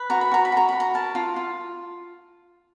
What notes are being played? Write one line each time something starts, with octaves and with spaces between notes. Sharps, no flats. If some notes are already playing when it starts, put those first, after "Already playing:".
Already playing: B4
F#4 A#5
B5
F#4 A#5
B5
F#4 A#5
F#4 B5
A#5
A#4 A5
F4
F4